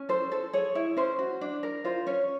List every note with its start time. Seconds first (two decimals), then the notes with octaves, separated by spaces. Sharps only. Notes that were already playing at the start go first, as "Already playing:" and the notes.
Already playing: C#4
0.09 A4 C5
0.31 A4 C5
0.53 G#4 C#5
0.75 E4
0.97 C#4 C5
1.19 F#4
1.41 D4
1.63 A#4
1.84 F4 C5
2.07 C#4 C#5